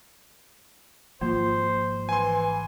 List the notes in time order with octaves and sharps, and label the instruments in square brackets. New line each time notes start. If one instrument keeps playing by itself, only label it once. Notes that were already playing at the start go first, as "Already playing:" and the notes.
[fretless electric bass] G#1 F3 [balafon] A#3 F4 [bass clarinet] C5
[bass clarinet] E3 [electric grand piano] G#5 C6